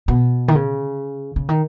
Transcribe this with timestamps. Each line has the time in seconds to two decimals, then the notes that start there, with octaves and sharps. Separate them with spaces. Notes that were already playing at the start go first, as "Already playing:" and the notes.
0.08 B2
0.48 D#3
0.55 C#3
1.36 C#3
1.49 D#3